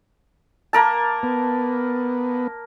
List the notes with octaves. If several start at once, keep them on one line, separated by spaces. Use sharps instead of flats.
A#3 A#4 A5
B3